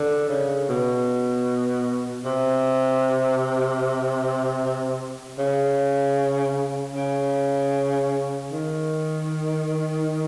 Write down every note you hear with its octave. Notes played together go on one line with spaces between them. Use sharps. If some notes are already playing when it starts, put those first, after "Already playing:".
Already playing: D3
C#3
B2
C3
C#3
C#3
D#3